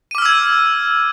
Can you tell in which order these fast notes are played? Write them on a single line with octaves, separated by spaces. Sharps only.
D#7 D6 F6 E6 G#6